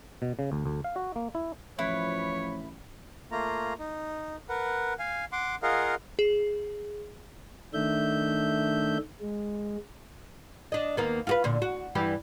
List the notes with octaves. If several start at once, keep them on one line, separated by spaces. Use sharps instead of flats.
B2
C#3
D2
D2
F5
F#4
A#3
E4
A1 F3 E4 B4 C#5
A3 A#3 F4 A#5
D#4
A#4 B4 F#5
F5 G#5
F#5 C6 D6
F4 G#4 A#4 D#5 F5 F#5
G#4
D#3 A3 D4 E5 G6
G#3
D4 D#5
D#2 A#3 B3
F4 F#4 B4
A#2 D3
F#4
G2 E3 G4